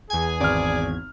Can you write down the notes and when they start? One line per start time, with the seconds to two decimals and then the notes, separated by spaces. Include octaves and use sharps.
0.10 E2 G#4 G#5 G#6
0.40 G#1 D5 F6